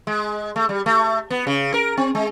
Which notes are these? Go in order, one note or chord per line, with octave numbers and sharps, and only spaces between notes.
G#3
A3
G3
A3
B3
C#3
A#4
C4
G#3